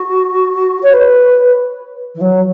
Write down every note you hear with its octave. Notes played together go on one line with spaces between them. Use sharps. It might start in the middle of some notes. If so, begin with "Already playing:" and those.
Already playing: F#4
C#5
B4
E3
F#3